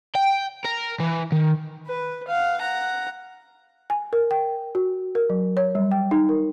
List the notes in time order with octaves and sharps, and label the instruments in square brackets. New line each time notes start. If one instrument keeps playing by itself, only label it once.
[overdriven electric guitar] G5
A#4
E3
D#3
[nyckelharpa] B4
F5 F#5
F#5 A#5
[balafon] G#5
A#4
G5
F#4
A#4
F#3
C#5
G3
G5
D#4
A#4